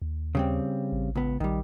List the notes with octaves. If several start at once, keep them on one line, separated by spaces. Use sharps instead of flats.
D#2
C#3 G3 C4
A1
C#2 B3
A#1 D#3 G3